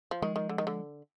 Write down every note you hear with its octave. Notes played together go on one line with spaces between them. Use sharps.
F3
D#3 F3 G#3
D#3
D3
D#3
D3